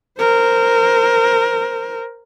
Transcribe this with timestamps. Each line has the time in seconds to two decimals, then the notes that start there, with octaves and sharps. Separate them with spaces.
0.19 A#4 C5